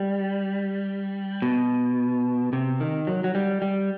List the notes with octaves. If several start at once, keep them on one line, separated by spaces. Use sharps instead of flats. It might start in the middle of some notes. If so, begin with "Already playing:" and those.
Already playing: G3
B2
C3
D#3
F#3
F#3
G3
G3